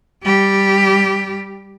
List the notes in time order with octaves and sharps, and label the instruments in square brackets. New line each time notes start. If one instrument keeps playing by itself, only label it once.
[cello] G3 G4